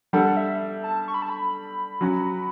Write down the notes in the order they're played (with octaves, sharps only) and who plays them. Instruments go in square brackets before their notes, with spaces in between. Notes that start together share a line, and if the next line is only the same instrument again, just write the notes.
[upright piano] G3 D4 A4 [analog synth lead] F#5
[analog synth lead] E5
A5
C#6
B5
A5
B5
[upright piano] F#3 C#4 F#4